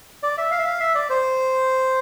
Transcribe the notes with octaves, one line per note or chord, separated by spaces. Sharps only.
D5
E5
F5
E5
F5
E5
D5
C5